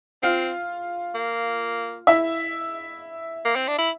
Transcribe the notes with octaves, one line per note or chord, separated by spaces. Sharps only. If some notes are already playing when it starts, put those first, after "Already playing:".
C4 F4 F5
A#3
E4 E5
A#3
C4
D4
E4